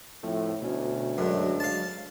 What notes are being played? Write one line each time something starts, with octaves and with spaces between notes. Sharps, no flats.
A2 F3 A3 C4
D2 B2 C#4
F#2 F#3 G#3 D4
F5 A5